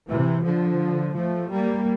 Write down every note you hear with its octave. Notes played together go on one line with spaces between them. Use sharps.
C3 E3
D3 F3
F3 A3
G3 A#3